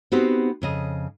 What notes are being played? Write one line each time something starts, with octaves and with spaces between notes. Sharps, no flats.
B3 C4 D#4 F#4 G4 C5
F2 C#3 D#5